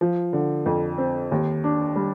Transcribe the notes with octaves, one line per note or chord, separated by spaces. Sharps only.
F3
D3
F2
C4
D#2
D4
G3